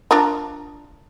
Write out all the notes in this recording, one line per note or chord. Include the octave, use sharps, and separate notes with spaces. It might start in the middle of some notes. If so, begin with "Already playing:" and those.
D4 F4 A#4